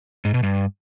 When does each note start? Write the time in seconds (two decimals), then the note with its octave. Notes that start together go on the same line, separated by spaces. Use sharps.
0.25 G#2
0.34 B2
0.43 G2